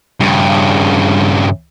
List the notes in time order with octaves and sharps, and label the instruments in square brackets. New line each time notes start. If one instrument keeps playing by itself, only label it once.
[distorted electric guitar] G2 C#3